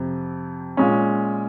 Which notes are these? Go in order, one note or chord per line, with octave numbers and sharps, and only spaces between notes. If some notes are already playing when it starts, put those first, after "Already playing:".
Already playing: F2 C3
A#2 G#3 C#4